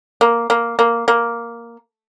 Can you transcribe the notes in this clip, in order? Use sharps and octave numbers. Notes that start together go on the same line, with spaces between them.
A#3
A#3
A#3
A#3